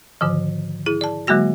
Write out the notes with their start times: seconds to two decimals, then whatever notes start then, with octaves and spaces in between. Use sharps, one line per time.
0.21 G#2 D3 D#3 F3
0.86 E4 G#4
1.01 D5 A5
1.27 D3 F#3 G#3 A#3 F#4 A#6